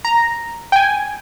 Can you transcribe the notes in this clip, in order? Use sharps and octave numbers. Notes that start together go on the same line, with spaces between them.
A#5
G5
G#5